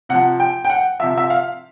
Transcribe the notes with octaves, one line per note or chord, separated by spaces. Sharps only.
C3 F3 F#5
G5
G5
F#5
C3 F3 E5
E5
F5